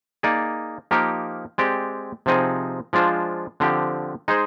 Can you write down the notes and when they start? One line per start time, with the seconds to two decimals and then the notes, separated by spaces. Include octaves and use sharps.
0.23 A#3 D#4 G#4 D5
0.91 F3 A#3 D#4 G4 A#4
1.58 G#3 C4 G4 D5
2.26 C3 F3 C4 D#4 G#4
2.93 F3 G#3 D4 F4 C5
3.60 D3 F3 C4 G4
4.28 G#3 D#4 G#4 C5